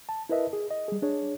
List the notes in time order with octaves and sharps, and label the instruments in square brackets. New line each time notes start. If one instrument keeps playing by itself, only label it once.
[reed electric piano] A5
E4 A#4 B4 D#5 E5
G#4
D#5
G3 G#4
D4 G#4 C#5